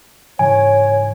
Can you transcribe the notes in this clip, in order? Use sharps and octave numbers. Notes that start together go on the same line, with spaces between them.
G#2 C#3 E3 C#5 G#5